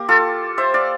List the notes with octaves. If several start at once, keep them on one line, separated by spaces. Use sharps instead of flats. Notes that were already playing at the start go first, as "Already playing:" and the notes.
Already playing: A#3 G4
F4 A4
C5 E5
D5 F5